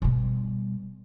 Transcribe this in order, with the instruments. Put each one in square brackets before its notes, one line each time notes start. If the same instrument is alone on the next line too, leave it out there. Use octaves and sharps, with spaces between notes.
[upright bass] B2 G3